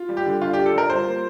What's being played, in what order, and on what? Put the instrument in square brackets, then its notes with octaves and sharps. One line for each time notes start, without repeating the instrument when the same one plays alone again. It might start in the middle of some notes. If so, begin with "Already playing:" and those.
Already playing: [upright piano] F4
G3
[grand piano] G4
[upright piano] D3
[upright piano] D4 [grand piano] F4
[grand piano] G4
[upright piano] F4
[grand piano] A4
[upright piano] G3 [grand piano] A#4
[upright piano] F4 [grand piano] C5
[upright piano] A#3